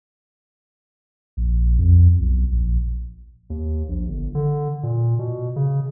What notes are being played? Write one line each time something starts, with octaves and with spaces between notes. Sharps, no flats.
A#1
F2
B1
A#1
D#2
A#1
G1
D3
A#2
B2
C#3